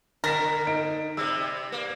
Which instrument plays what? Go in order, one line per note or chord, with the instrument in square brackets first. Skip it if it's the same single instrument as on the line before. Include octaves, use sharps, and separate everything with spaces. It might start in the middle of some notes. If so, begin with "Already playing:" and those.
[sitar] D3 [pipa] A#4 [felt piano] A6 B6 E7
[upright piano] D#4 [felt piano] D7
[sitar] C3 G3 [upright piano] E6
[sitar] A#3